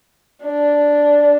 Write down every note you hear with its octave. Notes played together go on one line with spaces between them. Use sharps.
D4